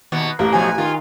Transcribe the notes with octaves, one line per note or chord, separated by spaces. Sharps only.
D#2 B2 B3
A1 A#3 G4 E5
B2 F3 F#3 G#5
D#3 F4